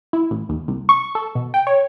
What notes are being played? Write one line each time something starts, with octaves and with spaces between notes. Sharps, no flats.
E4
A1
D#2
C2
C#6
A4
B2
G5
C#5